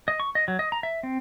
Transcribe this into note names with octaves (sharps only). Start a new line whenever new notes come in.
D#5
C#6
D#5
F#3
D#5
A#5
E5
C4